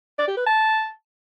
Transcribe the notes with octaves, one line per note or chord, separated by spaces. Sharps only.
D5
G4
B4
A5